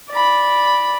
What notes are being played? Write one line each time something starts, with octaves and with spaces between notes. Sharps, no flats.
D5 B5